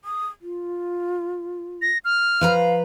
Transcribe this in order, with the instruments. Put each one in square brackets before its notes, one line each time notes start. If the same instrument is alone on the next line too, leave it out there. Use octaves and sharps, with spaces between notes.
[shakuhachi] D#6
F4
[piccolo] A#6
F6
[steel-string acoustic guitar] F3 B4 A#5 [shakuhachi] F5